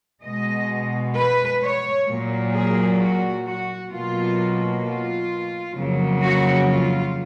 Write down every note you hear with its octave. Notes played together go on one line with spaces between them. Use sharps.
B2 G#3 D#5
B4
C#5
A#2 F#3 A#3
G#4
F#4
F#4
B2 F#3 A#3 F4
F4
F2 C#3 F#3 A#3
F#4
F4